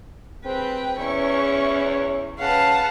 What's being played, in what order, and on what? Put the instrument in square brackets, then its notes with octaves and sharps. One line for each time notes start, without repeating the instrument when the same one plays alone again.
[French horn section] D2 G2 G#4 [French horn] C4 [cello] B4 [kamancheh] G5
[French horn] E2 [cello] C#4 E4 [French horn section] C#5 [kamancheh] C#6
[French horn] C#3 [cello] B4 F5 [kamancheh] F#5 A5